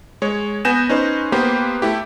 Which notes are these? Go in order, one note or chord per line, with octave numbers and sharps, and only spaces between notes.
G#3 C#5
B3 G#5 G6 A#6 E7
C#4 D#4 B4 C5
A#3 B3 G4 B4 C5
A3 E4 G4